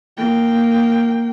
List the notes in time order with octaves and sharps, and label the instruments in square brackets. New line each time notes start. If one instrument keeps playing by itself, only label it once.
[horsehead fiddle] A#3 G5